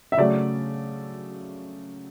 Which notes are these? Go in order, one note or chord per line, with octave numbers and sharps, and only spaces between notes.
E5
C#3 F#3 A3 D5